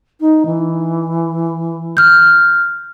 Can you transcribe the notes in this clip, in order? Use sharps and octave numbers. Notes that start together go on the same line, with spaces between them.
D#4
E3
F6 G6